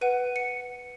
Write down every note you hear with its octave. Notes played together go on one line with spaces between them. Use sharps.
B4 F#5 D#7
C#7